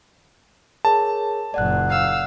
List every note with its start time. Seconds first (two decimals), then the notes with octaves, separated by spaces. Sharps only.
0.85 G#4 A#4 C#5 A5
1.54 F#1 A#2 D5 F#5 F#6
1.90 F5 E6